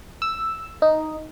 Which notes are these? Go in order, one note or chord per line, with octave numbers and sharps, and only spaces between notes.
E6
D#4